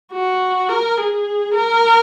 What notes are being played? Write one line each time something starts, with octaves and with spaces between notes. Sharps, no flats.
F#4
A#4
G#4
A#4